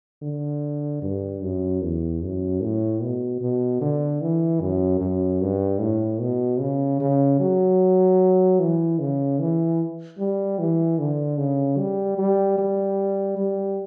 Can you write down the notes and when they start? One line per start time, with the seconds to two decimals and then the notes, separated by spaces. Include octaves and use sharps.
0.22 D3
1.03 G2
1.42 F#2
1.82 E2
2.22 F#2
2.62 A2
3.02 B2
3.41 B2
3.81 D3
4.21 E3
4.61 F#2
5.00 F#2
5.41 G2
5.81 A2
6.21 B2
6.60 C#3
7.01 C#3
7.40 F#3
8.60 E3
9.00 C#3
9.40 E3
10.19 G3
10.59 E3
10.99 D3
11.38 C#3
11.78 G3
12.18 G3
12.58 G3
13.37 G3